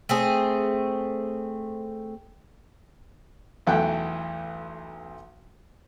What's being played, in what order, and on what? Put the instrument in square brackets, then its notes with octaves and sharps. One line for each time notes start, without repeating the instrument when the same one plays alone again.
[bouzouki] A3 C4 G#4
[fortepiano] B1 E2 A3 F#5 G5